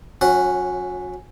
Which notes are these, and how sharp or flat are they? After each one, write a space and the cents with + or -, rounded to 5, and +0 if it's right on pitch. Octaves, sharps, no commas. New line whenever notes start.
F#3 -35 C#4 +0 F#5 +0